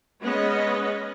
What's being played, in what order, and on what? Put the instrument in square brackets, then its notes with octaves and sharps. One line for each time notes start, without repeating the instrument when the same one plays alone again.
[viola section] G#3 B3 C#4 B4 D#5